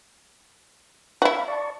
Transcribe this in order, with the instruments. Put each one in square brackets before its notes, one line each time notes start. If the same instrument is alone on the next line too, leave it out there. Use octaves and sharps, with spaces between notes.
[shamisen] E4 F#4 [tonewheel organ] F5 B5
[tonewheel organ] D5 A5 C#6